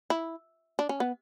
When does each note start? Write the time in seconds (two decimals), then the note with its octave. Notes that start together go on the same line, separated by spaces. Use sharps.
0.10 E4
0.79 D4
0.89 C#4
1.00 B3